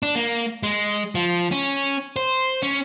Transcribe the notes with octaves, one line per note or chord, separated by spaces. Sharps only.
D4
A#3
G#3
F3
C#4
C5
C#4